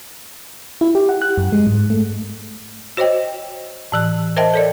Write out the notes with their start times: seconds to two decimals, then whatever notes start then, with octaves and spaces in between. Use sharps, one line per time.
0.81 E4
0.95 G4
1.09 F#5
1.22 F#6
1.38 F#2
1.52 G#3
1.67 G#2
1.90 A3
2.97 F#4 C5 C#5 D#5 G5
3.92 A2 E3 F#6
4.37 A#4 C5 D#5 E5 G5 A5
4.54 A4 C#5 D5